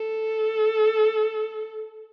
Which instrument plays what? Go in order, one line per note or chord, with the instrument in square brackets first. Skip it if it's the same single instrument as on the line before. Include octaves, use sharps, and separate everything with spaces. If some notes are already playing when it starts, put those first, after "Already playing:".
Already playing: [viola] A4